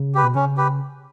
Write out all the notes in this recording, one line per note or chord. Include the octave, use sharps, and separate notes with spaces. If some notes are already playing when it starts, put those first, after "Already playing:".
Already playing: C#3
G4 B4
B2
C#3 C#4
G4 B4